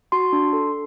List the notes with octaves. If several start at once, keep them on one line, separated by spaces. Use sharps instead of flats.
F#4 C6
D4
A4